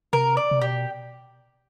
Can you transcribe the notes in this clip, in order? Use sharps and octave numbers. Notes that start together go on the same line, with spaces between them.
C3 A#4
D5
C3
B2 G4